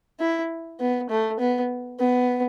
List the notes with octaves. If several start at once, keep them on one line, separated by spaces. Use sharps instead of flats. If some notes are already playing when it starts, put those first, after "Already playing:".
E4
B3
A3
B3
B3